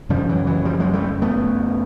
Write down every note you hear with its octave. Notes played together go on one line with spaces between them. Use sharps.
F#2 C#3 F3 G3
E3 F#3
E3 F#3
F3 G3
F#3 G#3
G3 A3
A3 B3